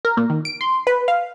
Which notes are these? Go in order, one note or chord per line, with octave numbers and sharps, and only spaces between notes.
A#4
A#2
D#3
D7
C6
B4
F5